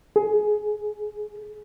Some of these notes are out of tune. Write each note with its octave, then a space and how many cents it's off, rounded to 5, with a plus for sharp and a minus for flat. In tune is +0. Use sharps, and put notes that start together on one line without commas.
G#4 +20